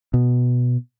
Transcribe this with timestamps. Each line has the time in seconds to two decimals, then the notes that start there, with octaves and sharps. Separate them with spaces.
0.14 B2